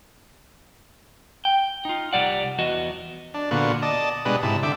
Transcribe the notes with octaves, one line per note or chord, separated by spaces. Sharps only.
G5
D#4 F4
C2 A#2 G3 D5 F#5
E2 B3 F#4 D#5
D4
A#2 D3 B3 F#4
D5 D#5 A5
B2 G3 G#3 D4 B4 D#6
G#2 C3 E4 A5
D3 E5 G5 D6